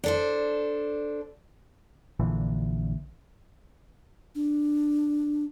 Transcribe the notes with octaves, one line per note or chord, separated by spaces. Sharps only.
D4 A4 C5
A#1 A#2 D3 E3
D4